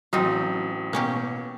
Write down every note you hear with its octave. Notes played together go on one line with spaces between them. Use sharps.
A1 F#3 C4 D#4 F4 D#6
B2 A#3 C#4 G4